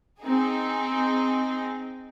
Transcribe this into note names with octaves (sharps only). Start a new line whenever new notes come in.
C4 D#4 G#4